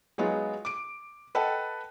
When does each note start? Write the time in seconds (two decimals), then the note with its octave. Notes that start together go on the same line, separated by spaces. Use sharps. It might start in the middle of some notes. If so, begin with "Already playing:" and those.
0.18 F#3 G#3 B3 D#4 F4 G#4
0.65 D6 D7
1.35 A4 B4 D#5 F#5 G5 A5